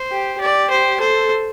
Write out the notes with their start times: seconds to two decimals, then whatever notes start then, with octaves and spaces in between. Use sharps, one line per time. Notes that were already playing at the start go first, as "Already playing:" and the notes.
Already playing: C5
0.11 G4
0.40 G4 D5
0.70 C5
0.99 A4 C5